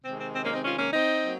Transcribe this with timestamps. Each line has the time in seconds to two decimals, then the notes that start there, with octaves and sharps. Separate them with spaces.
0.05 C3 D#3 G#3 C4
0.19 C4
0.34 C4
0.44 A#3 C#4
0.53 C4 D#4
0.63 C#4 F4
0.78 A#3 C#4
0.92 C4 D#4
1.23 F#3 A#3